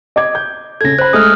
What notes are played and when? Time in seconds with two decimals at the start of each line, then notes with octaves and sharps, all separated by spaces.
0.16 D#5 D6 G#6
0.35 G6
0.81 C#3 A4 G#6 A#6
0.99 C5 B5 F#6
1.13 G#3 A3 D#6 F6